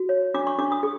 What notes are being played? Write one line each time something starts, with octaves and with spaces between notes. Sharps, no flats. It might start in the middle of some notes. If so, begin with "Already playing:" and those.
Already playing: F#4
C#5
D4 D6
C#6
D4 D6
D#6
G#4